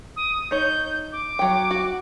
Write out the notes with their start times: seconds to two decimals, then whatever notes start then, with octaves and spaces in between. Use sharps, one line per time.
0.16 D#6
0.51 D#4 C#5 G6
1.12 D6
1.39 F#3 G5
1.71 F#4